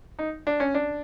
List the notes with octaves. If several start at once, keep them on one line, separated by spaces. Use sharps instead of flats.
D#4
D4
C#4
D4